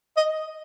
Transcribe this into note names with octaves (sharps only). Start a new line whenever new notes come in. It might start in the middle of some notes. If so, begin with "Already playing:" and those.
D#5